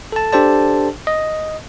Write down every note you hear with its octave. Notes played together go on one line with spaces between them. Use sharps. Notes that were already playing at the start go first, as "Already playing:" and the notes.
A4 A5
D4 G4 A4 C5 D5 A5
D#5